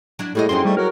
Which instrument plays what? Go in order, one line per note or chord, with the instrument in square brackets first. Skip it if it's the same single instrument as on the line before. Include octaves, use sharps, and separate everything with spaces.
[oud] F#3 D4 E4
[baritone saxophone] A2 [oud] G3 A#3 D#5 [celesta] E4 G#4 A4
[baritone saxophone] F#2 [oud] A#3 C4 D#4 [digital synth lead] C6
[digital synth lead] G3 [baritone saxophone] A3
[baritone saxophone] F#3 [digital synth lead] A#4